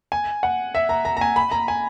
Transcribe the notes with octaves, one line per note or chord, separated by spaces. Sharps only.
G#5
F#5
E5
A#5
A#5
A#5
G#5
B5
A#5
G#5